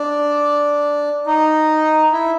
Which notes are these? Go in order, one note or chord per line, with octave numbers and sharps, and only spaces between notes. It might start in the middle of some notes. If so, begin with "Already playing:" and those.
Already playing: D4
D#4
E4